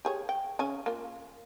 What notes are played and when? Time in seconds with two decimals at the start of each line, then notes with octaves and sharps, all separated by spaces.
0.05 G4 G#4 C#5
0.29 G5
0.59 C#3 C#4 G#5
0.86 A#3 F4